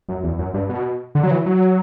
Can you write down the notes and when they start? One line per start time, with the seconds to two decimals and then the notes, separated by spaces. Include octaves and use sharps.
0.09 F#2
0.24 E2
0.39 F#2
0.54 G2
0.69 B2
1.15 D3
1.23 F#3
1.31 E3
1.46 F#3